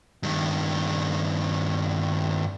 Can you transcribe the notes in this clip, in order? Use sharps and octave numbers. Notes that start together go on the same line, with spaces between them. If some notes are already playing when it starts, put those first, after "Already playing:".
G2 D#3